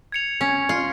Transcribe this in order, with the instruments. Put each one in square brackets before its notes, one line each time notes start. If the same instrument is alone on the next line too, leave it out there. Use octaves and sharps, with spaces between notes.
[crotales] G#6 C#7 F7
[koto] C#4
F4